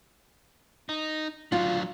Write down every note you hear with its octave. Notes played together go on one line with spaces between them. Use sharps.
D#4
F#3 D4 F4